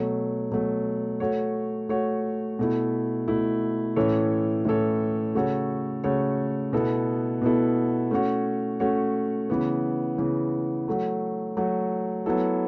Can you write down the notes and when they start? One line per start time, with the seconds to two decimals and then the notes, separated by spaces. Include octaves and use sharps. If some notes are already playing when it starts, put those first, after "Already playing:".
Already playing: B2 F#3 A3
0.52 B2 F#3 A3
1.20 A3 F#4 C#5
1.89 A3 F#4 C#5
2.59 B2 A3 E4
3.28 B2 A3 E4
3.96 A2 E3 C#4 A4 C#5
4.65 A2 E3 C#4 A4 C#5
5.35 C#3 A3 F#4 A4 C#5
6.04 C#3 A3 F#4 A4 C#5
6.73 B2 B3 E4 A4
7.42 B2 B3 E4 A4
8.11 A3 C#4 F#4 C#5
8.80 A3 C#4 F#4 C#5
9.50 C#3 E3 B3
10.18 C#3 E3 B3
10.88 F#3 A3 F#4
11.57 F#3 A3 F#4
12.26 F#3 B3 E4 A4